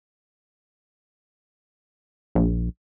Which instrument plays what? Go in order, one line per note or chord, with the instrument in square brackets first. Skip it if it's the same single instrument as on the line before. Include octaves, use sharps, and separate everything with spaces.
[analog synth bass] A#1